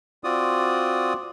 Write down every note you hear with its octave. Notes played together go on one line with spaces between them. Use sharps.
C4 F4 F#4 D5 D#6